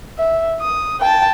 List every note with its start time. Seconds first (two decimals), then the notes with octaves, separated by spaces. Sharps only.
0.18 E5
0.61 D#6
1.00 G5 A5